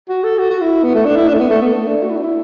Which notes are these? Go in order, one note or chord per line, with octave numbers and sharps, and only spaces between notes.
F#4
A4
F#4
F#4
E4
B3
A3
D4
E4
D4
A3
B3
A3
B3
A3
D4
F#4
E4
D4
E4